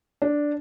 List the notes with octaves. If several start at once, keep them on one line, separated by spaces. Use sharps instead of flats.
D4